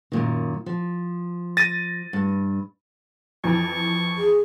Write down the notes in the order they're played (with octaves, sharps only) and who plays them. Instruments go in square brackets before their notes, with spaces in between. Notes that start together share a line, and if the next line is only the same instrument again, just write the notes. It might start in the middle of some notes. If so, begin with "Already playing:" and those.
[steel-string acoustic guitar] F#2 A#2 D#3
F3
[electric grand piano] A6 A#6 D#7
[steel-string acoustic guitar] G2
[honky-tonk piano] F2 E3 [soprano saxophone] C#6
[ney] G#4